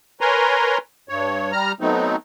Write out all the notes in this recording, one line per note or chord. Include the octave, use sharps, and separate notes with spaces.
A#4 B4 C#5 G#5 A#5 C6
G2 C#5
G3 A#5 F6
F#3 A3 B3 C4 D#4